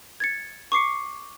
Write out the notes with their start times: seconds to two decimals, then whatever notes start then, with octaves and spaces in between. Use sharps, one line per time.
0.20 G#6 A6 C#7
0.72 C#6 D6 C7 C#7